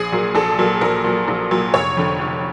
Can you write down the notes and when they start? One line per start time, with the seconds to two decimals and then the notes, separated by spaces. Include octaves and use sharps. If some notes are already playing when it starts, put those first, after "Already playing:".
Already playing: A#1 G#4
0.12 A#2 F#3 A#3
0.35 A#1 A4
0.58 A#2 F#3 A#3
0.81 A#1 A#4
1.04 A#2 F#3 A#3
1.28 A#1
1.51 A#2 F#3 A#3
1.74 F1 C#5
1.97 F2 D3
2.20 F1